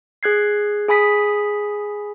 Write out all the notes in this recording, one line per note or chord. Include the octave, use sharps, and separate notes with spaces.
G#4 F#6 G#6 C7
G#4 G#5 B5 D#6 B6